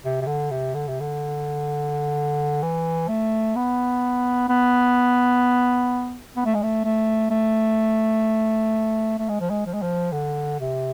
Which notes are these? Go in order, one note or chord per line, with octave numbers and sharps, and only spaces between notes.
C3
C3
D3
C3
D3
C3
D3
E3
A3
B3
B3
B3
A3
G#3
A3
A3
A3
A3
G#3
F3
G#3
F3
G#3
F3
D3
C3